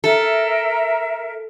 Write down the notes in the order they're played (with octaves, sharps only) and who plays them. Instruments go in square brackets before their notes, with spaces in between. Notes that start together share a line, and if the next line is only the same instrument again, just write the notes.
[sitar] A4 [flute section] A#4 E5